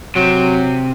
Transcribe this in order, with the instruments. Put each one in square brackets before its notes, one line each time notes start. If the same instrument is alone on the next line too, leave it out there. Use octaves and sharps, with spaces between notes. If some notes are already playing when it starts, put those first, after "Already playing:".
[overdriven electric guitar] C3 [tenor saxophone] F#3